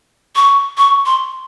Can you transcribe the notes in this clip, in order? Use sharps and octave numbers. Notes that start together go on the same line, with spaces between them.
C#6
C#6
C6